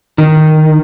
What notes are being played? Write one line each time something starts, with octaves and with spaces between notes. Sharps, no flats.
D#3